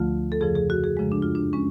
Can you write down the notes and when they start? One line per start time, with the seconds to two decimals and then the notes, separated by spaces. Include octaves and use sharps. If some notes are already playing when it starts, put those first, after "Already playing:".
Already playing: D2 D3 F3 A3 F4
0.32 A4
0.41 F2 C#3 F3 G#4
0.55 G#4
0.70 F#4
0.84 G#4
0.97 F#2 C#3 F3 G#3
1.12 D4
1.22 F4
1.35 D4
1.53 G#3 C#4